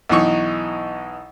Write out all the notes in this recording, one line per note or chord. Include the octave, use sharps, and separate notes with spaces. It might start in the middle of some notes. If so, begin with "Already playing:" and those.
B1 E3 D#4 C#6